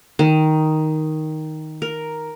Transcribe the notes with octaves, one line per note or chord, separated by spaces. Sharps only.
D#3
A#4